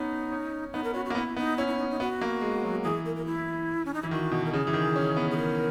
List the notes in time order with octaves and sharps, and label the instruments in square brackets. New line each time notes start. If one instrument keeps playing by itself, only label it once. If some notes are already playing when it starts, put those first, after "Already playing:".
Already playing: [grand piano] B3 C#4 [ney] D#4
[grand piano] C#4
[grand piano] B3 [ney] D#4
[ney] A#4
[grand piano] C#4 [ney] F#4
[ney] F#4
[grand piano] A#3
[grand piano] B3 [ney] E4
[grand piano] B3 [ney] D#4
[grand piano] C#4 [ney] E4
[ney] E4
D#4
D#4
[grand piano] B3 [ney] F#4
[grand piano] A#3
G#3
F#3
[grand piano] E3 [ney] G#4
[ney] A#4
A#4
E4
C#4
D#4
[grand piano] E3 [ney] E4
[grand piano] D#3 [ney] F#4
[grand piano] B2
[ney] A#4
[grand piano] C#3 [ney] G#4
[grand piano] E3
D#3
C#4
B3
[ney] G#4
A#4